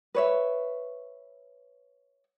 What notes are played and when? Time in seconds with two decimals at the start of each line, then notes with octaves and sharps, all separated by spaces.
0.14 B4 C#5 E5